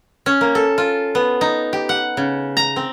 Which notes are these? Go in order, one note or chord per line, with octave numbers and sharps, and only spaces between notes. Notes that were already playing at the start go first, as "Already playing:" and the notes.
C#4
A#3
A4
F4
B3
D#4
G4
F#5
C#3
A#5
C4